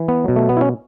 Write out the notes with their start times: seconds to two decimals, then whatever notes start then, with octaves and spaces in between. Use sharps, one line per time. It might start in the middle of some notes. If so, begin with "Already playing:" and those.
Already playing: E3
0.08 B3
0.24 B2 F#3
0.36 A3
0.49 B3
0.57 E4
0.61 C#4